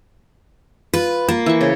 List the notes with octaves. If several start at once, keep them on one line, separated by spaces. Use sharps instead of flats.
F4 B4
A#3 F4
E3 E5 C#6
C#3 C5